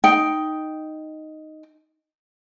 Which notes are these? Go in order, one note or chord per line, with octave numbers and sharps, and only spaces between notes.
D#4 G5